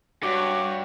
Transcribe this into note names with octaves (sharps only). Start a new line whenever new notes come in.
G2 F#4 C#5 D6